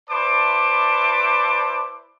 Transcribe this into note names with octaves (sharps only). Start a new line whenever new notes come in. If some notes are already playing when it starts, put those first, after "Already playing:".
E4 B4 C5 D5 A5 D6